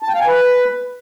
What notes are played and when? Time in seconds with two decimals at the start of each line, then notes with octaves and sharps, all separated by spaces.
0.02 A5
0.08 G5
0.14 F5
0.21 G#5
0.27 B4